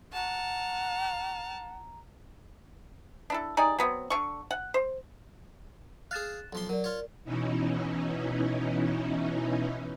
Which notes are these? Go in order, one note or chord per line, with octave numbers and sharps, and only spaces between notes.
F#5 A5 A#5 F6
D4 E4 A4
D#4 G4 G#4 D5
F#3 B3 C4
D3 C#6
F#5
C5
G#4 F5 F#6 A6 E7
B1 F3 C6
F#3 A#4 D5
F4 C#5
B2 E3 C#4 D#4 E4